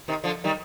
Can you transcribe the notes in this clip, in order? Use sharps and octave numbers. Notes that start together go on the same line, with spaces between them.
C3 D#3
D3 F3
D#3 G3